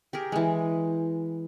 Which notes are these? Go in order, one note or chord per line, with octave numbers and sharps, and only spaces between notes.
G4 G#4 A#4
E3 G#3